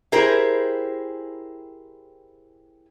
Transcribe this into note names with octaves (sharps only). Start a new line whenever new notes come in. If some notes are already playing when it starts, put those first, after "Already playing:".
E4 G4 G#4 A#4 C5